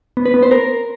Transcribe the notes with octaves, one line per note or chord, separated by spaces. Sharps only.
B3
B4
B3
C5
A#4